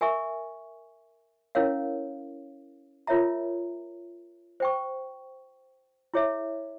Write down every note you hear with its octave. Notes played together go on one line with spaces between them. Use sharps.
A#4 E5 G#5 C#6
C#4 E4 A#4 C#5 F5
F4 A#4 C#5 E5 A#5
C5 G5 C#6
E4 G#4 C#5 E5